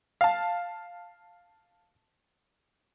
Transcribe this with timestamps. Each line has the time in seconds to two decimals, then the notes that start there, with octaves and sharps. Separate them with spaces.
0.21 F5 A5